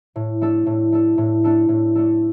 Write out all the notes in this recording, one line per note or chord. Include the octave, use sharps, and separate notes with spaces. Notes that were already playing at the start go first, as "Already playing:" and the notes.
A2
A3 D4 A4
A2
A3 D4 A4
A2
A3 D4 A4
A2
A3 D4 A4